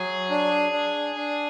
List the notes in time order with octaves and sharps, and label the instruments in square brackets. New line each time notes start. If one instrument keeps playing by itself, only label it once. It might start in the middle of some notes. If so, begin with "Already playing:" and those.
Already playing: [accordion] F#3 [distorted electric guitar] G#4
[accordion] D4
D4
D4